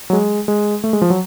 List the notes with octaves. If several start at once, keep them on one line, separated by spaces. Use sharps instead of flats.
F#3
G#3
G#3
A3
G#3
F3
F#3